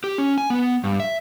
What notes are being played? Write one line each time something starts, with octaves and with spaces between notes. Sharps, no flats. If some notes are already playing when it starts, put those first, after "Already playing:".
G4
C#4
G#5
B3
G2
E5